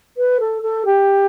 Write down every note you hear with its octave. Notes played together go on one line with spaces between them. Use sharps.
B4
A4
A4
G4